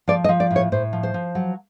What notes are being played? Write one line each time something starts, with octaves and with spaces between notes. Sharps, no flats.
F3 D5
D#5
F3
D5
A2
C#5
A2 C5
F3
C5
F3
F#3